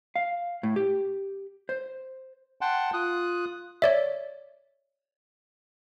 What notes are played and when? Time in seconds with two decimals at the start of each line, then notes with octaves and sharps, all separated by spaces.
0.16 F5
0.63 A2
0.76 G4
1.69 C5
2.61 F#5 G5 A5 C6
2.94 F4 D#6 F#6
3.82 C#5 D5 E5